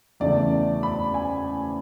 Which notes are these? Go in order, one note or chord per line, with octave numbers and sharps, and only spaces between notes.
E2 C#3 E3 A3 D5
B5
G#5